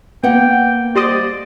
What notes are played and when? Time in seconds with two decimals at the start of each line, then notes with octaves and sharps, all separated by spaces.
0.23 A#3 B3 B4 F#5 G5
0.95 G3 C5 D5 D#5